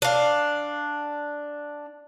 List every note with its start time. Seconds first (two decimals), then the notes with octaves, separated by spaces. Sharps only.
0.02 D4 F5